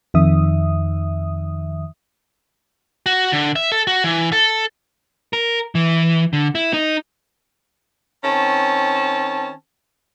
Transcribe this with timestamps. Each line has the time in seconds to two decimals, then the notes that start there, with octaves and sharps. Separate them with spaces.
0.14 F2 D#3 E5 D#6
3.06 F#4
3.32 D3
3.56 E5
3.72 A4
3.87 F#4
4.04 E3
4.32 A4
5.33 A#4
5.75 E3
6.33 D3
6.55 E4
6.73 D#4
8.23 D#3 C4 C#4 A5